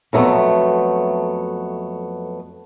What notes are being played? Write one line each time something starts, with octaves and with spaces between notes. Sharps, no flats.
F2 F#3 A3 B3